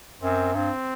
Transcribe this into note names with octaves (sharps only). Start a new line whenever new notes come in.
F#2 C4
G2 C4